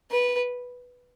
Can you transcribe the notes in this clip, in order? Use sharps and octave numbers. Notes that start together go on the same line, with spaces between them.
B4